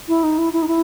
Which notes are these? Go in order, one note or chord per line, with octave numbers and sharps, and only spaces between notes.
E4
D#4
E4
E4
D#4
E4